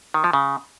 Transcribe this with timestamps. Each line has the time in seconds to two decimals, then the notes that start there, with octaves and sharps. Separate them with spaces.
0.14 D#3
0.24 F3
0.33 C#3